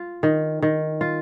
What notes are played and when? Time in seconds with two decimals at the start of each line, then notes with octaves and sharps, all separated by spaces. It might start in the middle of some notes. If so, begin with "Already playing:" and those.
Already playing: F4
0.23 D#3
0.62 D#3
1.01 F4